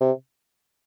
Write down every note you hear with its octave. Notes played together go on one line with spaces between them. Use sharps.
C3